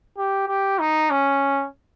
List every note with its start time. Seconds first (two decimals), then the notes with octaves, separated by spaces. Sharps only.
0.18 G4
0.48 G4
0.79 D#4
1.10 C#4